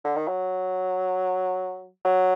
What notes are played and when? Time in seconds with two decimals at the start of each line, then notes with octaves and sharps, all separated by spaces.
0.04 D3
0.16 D#3
0.28 F#3
2.05 F#3